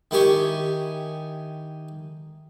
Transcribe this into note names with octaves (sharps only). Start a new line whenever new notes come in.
D#3 E4 G4 G#5 C#6